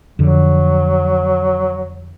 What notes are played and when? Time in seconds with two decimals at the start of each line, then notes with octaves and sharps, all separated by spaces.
0.19 F2 D3 F#3